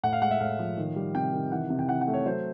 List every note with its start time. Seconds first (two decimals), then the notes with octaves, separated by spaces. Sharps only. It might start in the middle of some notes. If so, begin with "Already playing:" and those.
0.03 A2 F#5
0.13 F5
0.22 G#3 F#5
0.31 E5
0.40 A2 F5
0.59 F3
0.78 D#3
0.96 G3
1.15 C3 G5
1.33 D#3
1.52 E3 F#5
1.70 C3
1.79 G5
1.89 E3 F#5
2.01 F#5
2.08 A3
2.14 C#5
2.26 F#3 C5